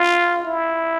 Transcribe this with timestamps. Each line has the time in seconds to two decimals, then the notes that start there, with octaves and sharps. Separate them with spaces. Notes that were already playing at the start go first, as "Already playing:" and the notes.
Already playing: F4
0.45 E4